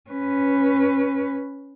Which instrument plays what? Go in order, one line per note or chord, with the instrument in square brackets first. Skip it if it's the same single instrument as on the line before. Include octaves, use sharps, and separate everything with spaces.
[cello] C#4 B4